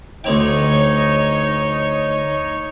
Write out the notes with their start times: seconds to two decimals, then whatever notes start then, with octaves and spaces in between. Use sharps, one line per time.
0.24 D2 C4 D#4 C#5 G5